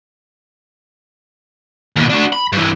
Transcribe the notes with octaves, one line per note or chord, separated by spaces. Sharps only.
D#2 B2
D4 F#4
B5
G2 E3